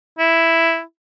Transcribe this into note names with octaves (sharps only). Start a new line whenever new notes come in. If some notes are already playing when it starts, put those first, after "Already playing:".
E4